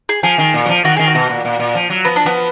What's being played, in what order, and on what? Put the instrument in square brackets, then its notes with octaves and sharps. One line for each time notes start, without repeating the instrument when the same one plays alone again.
[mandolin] G#4
[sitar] F3 [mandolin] G#4
[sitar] D#3
A#2
F#3
F3
[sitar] D#3 [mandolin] F#4
[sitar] D#3 [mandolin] G#4
[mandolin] F#4
[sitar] B2
A#2
A#2
A#2
F3
F#3
[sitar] F3 [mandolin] B3
[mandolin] D4
[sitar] F3 [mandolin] B3